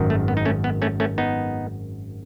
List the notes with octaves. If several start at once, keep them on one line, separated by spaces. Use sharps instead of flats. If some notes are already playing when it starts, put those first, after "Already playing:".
Already playing: G#1 F#2 D#3
A3
B3
D#4
A3 C#4
B3
A3 C#4
A3 C#4
B3 D#4